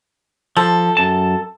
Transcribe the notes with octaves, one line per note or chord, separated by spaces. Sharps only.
F3 A4
F#2 A5